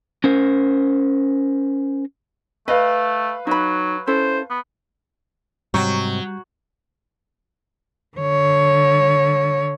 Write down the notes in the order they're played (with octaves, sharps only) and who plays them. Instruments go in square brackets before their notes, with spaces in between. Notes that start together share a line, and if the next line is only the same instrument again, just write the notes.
[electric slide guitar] C#4 A#4 C5
[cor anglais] A3 [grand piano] B4 F5 [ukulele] D#5
[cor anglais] F#3 [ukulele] D#4 B5
[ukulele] C#4 E4 A4 [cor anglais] C5
[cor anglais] B3
[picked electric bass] G#2 C3 [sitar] F#3 [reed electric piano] G3 C#6 G6
[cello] D3 C#5